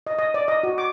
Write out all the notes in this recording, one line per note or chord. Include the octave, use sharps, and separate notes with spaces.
D#5
D#5
D5
D#5
F#4
D6